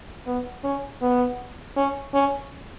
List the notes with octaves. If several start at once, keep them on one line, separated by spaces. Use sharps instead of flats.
B3
C#4
B3
C#4
C#4